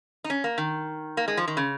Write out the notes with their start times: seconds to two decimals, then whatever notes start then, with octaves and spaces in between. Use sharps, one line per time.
0.24 D#4
0.30 C#4
0.44 A#3
0.58 D#3
1.17 A#3
1.28 G#3
1.37 F3
1.48 D#3
1.57 C#3